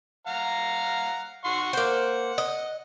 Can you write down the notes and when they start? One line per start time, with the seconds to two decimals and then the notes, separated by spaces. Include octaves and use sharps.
0.27 F5 F#5 A#5
1.45 F#5 C6 C#6
1.73 A#3 C5 F#5
2.38 D#5